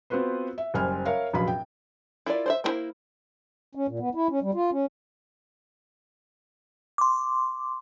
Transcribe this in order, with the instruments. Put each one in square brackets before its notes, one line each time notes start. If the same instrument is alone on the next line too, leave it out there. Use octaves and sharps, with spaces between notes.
[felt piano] B3 C4 F4 F#4 B4 C5
E5
F#1 G3 C5 G#5 F6
A#4 C#5 E5 F5
F1 A#1 F#2 F#3 F5 B5
G5
[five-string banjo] E4 F4 A#4 D5
C5 D5 E5
A#3 B3 E4 A#4 C5
[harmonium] C#4
A#2
B3
E4
C#4
G3
F4
C#4
[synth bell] C6 D6